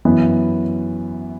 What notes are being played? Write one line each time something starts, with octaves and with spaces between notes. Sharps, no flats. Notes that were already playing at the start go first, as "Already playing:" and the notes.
F#2 E3 B3